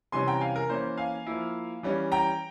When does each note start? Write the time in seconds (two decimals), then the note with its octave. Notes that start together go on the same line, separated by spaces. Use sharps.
0.12 C3 E3 G3 C#4 G#5 C6
0.27 G5 A#5
0.41 F5 G#5
0.56 A#4
0.69 E3 A#3 C#4 C5
0.97 F5 G#5
1.26 F3 A#3 E4
1.83 E3 G3 C#4
2.12 G5 A#5